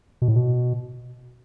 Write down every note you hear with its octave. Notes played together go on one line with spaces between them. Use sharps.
B2
A2
B2